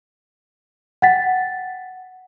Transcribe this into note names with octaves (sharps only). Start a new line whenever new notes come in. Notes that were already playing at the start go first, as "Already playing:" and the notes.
F#5 G5 A6 B6